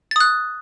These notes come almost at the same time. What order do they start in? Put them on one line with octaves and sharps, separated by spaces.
A6 D#6 F#6